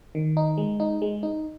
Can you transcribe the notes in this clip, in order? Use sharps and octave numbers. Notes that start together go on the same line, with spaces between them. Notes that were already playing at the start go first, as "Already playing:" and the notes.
D#3
D#4
G#3
D#4
G#3
D#4